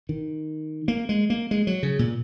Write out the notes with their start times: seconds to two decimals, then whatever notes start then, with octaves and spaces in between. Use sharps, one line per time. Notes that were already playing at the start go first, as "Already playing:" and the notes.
0.09 D#3
0.88 A#3
1.09 G#3
1.30 A#3
1.51 G#3
1.67 F#3
1.83 C#3
1.99 A#2